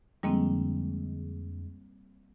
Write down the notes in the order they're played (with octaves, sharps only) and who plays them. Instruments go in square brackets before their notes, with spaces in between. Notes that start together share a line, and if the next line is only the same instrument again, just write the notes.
[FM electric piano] F2 D3 G#3 [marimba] G3 A#3 C4